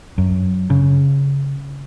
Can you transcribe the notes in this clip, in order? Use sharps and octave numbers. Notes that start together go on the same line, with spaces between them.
F#2
C#3